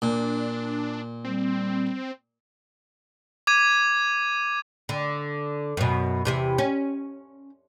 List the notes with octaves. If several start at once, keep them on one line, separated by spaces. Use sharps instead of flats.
A#2 D4
G3 C4
D6 G#6 D#7
D3
F#2 B2
E2 C3 E4
C#4